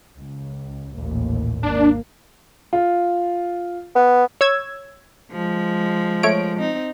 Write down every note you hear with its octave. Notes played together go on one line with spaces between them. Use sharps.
C#2
A1 D#2 A#2
G#1 A#3 D4
F4
B3
C#5 E6 G#6
F3 G#3
A3 C#5 D7
C4 D#4